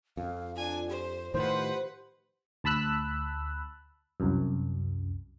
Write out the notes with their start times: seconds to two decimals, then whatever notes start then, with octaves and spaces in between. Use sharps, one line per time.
0.17 F2 F5
0.55 D4 F4 G#5
0.88 G4 C5
1.34 A2 D#3 F3 B4 C5 F#5
2.64 D2 A5 B5 E6 F#6
4.20 C2 F#2